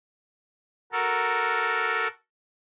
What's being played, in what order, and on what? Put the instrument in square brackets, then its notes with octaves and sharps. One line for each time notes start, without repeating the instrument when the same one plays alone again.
[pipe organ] F#4 A4 A#4